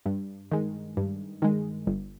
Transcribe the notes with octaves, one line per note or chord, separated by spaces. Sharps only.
G2
D#3 G#3
G2
D#3 G#3
G1